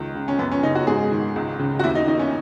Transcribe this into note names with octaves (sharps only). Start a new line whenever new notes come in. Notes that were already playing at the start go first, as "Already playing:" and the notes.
Already playing: C#2 D#3
C#3
C#4
F#2 B3
C#4
C#3 D#4
F#4
G#2 G#4
D#3
C#2
C#3
F#4
D#2 E4
D#4
D#3 D#4
C#4